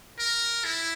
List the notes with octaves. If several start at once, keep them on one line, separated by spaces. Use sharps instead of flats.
A#4
E4